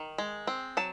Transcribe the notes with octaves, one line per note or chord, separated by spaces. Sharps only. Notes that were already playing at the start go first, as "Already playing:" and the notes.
Already playing: D#3
G#3
C4
F#3 A5